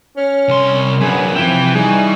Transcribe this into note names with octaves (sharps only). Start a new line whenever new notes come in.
C#4 F6
C2 C6
F#2 D3 G#4 B4 B5
C3 F3 E4 B4 G5 B6
G3 D#4 G#4 C#6